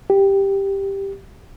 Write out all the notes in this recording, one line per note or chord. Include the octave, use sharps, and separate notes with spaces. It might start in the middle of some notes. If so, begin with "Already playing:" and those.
G4